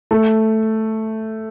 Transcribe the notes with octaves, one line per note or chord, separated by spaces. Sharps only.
A3